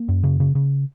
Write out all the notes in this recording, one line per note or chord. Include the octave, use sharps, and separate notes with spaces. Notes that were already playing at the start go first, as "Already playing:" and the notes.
Already playing: A#3
F#2
C#3
C#3
C#3